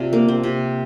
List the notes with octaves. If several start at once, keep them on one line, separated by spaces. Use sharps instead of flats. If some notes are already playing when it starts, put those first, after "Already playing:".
Already playing: C3 D4 F4
A#3
C4
C3